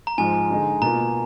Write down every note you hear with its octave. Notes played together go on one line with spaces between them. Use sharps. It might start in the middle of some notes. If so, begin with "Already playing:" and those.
A#5
G#2 F3 G#3 G#5
D3 G#3 D#4 G#4
B2 A#3 F4 A#5